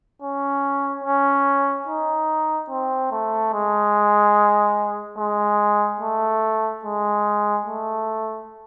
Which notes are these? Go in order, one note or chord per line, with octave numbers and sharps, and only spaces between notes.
C#4
C#4
D#4
C4
A3
G#3
G#3
A3
G#3
A3